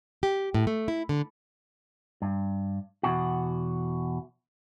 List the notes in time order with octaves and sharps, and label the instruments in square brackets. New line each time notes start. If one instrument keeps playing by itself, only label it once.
[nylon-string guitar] G4
A2
A3
E4
D3
[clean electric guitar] G2
E2 B2 F#4